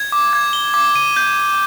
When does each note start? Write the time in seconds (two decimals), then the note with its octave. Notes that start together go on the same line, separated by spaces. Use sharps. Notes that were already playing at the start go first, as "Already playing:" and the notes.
Already playing: G#6
0.12 D6
0.33 G#6
0.53 G7
0.74 D6
0.95 D#7
1.16 G6